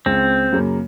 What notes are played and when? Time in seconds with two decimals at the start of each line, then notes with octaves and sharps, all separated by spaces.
0.06 C#2 C4
0.52 F#2 C#3 A#3